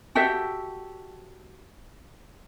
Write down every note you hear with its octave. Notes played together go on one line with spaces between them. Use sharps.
F#4 G4 A4 E5